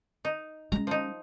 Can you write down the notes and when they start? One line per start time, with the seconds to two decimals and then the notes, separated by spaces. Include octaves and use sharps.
0.25 D#4
0.72 G#3 C#4 A#5
0.87 F3 D#4